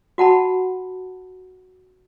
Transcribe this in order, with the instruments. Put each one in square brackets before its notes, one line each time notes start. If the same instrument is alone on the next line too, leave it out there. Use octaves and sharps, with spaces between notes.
[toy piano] F#4 F#5 A5 B5